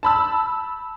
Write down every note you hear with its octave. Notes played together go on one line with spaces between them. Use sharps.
A5 B5 E6